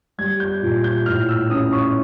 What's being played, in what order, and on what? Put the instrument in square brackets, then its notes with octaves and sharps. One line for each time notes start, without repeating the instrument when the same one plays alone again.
[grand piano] G3 G#6
G6
A#2
G6
A2 F6
E6
C#4 D#6
C#6